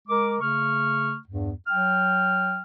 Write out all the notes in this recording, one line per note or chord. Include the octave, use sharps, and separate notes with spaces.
G#3 A#4 D6
C#3 A3 C#6 F6
E2 G2
F#3 G5 F6